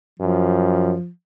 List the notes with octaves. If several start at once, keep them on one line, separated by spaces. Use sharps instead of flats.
F#2 F3